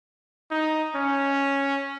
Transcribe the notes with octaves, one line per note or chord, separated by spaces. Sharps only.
D#4
C#4